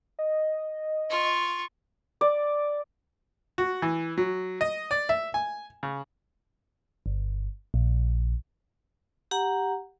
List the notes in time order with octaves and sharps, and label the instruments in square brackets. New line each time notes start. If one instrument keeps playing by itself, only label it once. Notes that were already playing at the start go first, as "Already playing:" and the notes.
[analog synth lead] D#5
[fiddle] F4 C#6
[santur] D5
[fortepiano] F#4
E3
F#3
D#5
D5
E5
G#5
C#3
[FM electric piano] G1
A#1
[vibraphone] G4 F#5 A#5